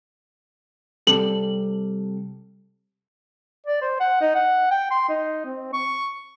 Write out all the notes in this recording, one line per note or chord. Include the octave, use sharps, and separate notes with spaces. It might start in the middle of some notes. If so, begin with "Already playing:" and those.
C3 G3 A4 F#7
D5
C5
F#5
D#4
F#5
G5
C6
D#4
C4
C#6